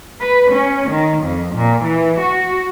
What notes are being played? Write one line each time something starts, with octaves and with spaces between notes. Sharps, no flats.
B4
C#4
D#3
F2
A#2
E3
F#4